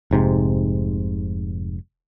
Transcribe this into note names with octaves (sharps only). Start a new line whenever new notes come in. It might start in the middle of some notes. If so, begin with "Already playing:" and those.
F1 G#2 C3